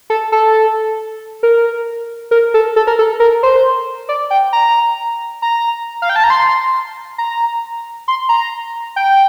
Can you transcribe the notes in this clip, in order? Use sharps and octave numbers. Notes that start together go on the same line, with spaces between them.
A4
A4
A#4
A#4
A4
A4
A#4
A4
A#4
C5
D5
G5
A#5
A#5
F5
G5
A5
A#5
C6
A#5
C6
A#5
G5